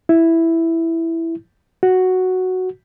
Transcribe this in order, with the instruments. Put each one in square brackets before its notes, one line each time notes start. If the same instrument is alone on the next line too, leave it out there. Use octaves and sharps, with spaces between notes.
[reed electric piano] E4
F#4